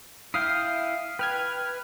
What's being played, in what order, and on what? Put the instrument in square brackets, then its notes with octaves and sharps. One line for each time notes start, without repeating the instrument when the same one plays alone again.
[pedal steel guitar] E4 F5 G5 [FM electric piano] E5 D#6 C7
[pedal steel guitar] B4 [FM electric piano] G5 F6 G#6